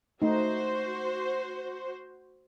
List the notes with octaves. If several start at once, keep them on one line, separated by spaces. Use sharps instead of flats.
A3 D#4 F#4 C5